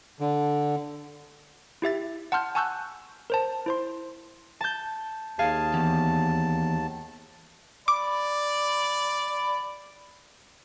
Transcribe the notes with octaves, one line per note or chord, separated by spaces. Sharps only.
D3
E4 G4 E5 A6
F#5 A5 C6 F6 G6
G#5 A5 C#6 E6 F#6 G6
A#4 C5 A5
E4 C5 C6
A5 G6
D#2 G#4 F5 A5
E2
D5 B5 D6